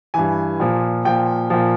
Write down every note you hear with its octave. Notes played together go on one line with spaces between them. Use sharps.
G2 E3 G#5
A#2 F3
A#2 F3 G5
A#2 F3